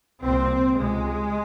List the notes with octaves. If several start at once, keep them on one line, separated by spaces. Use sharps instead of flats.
C2 A#2 C4
C#2 C3 G#3